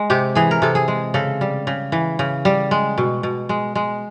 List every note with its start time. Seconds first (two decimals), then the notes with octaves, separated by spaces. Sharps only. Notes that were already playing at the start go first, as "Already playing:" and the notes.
Already playing: G#3
0.10 C3 G4
0.35 E3 G#4
0.51 A#4
0.62 C3 A4
0.75 G#4
0.88 G#3
1.14 C#3 A4
1.41 G3
1.67 C#3
1.92 E3
2.19 C#3
2.45 G3
2.71 G#3
2.98 B2
3.23 B2
3.49 G#3
3.75 G#3